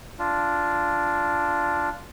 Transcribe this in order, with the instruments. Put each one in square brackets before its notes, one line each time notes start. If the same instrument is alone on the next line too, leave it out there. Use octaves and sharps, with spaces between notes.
[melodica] D4 F4